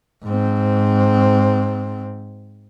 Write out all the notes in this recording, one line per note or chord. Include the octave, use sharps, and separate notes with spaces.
G#2 C4